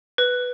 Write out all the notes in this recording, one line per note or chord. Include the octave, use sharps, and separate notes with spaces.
B4